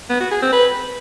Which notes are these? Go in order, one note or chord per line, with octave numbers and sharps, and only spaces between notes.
B3
F#4
G#4
C4
B4